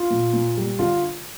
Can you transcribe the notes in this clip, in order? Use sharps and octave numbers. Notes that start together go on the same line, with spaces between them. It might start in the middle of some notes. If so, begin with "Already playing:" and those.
Already playing: F4
A#2
A#2
G3
D3 F4